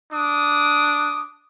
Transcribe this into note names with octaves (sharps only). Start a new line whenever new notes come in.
D4 D6 D#6